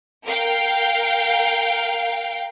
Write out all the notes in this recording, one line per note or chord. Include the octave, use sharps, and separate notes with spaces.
A#4 F5 G5